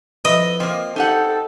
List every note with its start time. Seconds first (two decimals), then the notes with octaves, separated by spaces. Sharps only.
0.25 F2 E4 B4 D#5
0.60 F3 A#3 C4
0.96 D#4 G4 A4 F#5